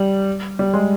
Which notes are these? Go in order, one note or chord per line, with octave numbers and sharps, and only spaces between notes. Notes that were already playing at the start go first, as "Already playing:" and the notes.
Already playing: G3
G3
G#3